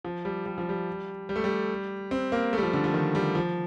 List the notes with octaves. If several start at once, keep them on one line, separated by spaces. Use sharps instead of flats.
F3
G3
G3
F3
G3
G3
A3
G3
C4
A#3
A3
G3
F3
D3
F3
D#3
G3
F3